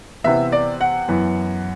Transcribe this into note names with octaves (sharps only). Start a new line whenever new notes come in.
C3 E3 B3 E5
D5
F#5
F#2 E3 B3